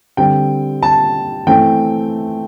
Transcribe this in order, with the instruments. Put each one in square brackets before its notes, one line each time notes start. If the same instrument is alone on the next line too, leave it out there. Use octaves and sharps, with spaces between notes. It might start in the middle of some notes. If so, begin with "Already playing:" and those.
[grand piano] D3 G3 C4 G5
A5
E3 A3 C4 G5